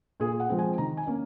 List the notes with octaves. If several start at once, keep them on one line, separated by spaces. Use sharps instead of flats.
A#2 G#4
F#5
F3 G#3 C4
G#5
D#3 A#5
G#5
A#3 C#4